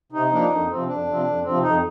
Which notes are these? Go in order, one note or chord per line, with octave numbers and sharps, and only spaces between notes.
C3 D#4
F3 A#3 D4
F2
C3 F3 C4
F2 D4
C3 F3 C4
F2
C3 F3 C4
F2 D#4